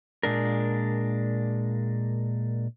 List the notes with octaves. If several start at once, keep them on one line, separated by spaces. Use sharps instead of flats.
A#2 G#3 D4 A#4